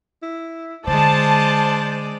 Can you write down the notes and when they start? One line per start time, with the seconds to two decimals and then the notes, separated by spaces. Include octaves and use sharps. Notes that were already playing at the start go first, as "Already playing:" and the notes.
0.22 E4
0.87 D3 G#3 C5 D5 A5